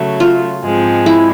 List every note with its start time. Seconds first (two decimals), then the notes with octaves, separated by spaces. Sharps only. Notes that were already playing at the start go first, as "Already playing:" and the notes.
Already playing: C#3 F#3 A3
0.20 F4
0.63 G#2 F3 G#3 C4
1.06 E4